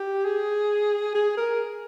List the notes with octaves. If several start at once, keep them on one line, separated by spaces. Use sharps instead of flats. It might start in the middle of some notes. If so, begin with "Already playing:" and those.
Already playing: G4
G#4
G#4
A#4